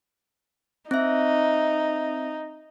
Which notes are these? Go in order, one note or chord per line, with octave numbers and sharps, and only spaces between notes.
C4 D#4 E5